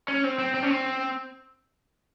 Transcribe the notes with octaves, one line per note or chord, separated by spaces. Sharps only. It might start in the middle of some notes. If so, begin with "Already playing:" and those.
C#4
C4
C4
C4
C#4
C4